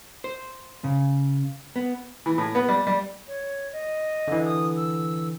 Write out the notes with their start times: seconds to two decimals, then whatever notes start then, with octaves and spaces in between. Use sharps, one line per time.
0.24 C5
0.84 C#3
1.76 B3
2.26 E3
2.38 A2
2.55 B3
2.69 G3
2.87 G3
3.28 C#5
3.73 D#5
4.28 D3 E3
4.45 D#6
4.77 E6